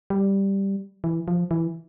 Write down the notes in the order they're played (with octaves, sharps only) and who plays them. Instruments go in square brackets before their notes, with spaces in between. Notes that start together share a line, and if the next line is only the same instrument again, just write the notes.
[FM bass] G3
E3
F3
E3